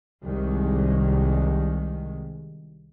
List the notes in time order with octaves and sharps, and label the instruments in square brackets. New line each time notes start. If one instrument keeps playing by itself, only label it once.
[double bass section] C2 D#3 G#3